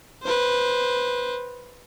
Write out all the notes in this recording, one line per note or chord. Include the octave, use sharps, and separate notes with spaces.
B4 C5